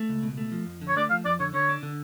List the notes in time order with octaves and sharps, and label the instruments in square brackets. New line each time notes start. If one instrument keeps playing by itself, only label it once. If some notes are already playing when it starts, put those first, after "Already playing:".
Already playing: [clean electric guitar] A3
C#2
B2
A3
F3
F2
D3
[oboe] C#5
[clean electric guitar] A3 [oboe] D5
[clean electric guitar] F3 [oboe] F5
[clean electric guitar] F2 [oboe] D5
[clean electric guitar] D3 [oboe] C#5
[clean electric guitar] D3 [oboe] C#5
[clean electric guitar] D4
D3